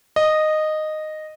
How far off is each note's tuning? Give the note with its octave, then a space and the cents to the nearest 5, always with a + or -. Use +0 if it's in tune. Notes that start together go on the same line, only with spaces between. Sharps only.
D#5 -10